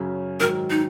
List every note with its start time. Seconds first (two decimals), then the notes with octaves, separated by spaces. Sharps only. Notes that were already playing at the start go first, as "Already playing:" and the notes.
Already playing: F#2 C#3 F#3 C#4
0.40 G#2 D#3 F#3 A#4
0.70 D#4